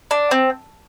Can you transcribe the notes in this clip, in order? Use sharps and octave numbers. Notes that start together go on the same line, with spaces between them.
D4
C4